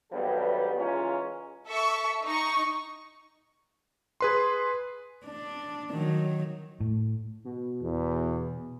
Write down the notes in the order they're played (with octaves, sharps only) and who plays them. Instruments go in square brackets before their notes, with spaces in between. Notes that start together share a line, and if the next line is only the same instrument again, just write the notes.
[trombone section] G#1 G2 F#3 G3 B3 A4
C#3 E3 G#3 C#4 F4 A#4
[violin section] A4 E5 C#6
D#4 C#6
[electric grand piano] G#4 B4 C6
[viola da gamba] D4
D#3 F#3
[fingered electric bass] A2
[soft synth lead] B2
[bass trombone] E2